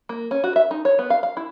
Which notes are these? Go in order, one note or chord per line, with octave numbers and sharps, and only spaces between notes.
A#3
C#4
F#4
E5
D#4
C#5
B3
F5
F5
E4